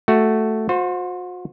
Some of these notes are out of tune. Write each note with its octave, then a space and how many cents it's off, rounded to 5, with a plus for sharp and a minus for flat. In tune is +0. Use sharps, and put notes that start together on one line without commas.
A3 +0 F#4 +0
F#4 -40 C5 +0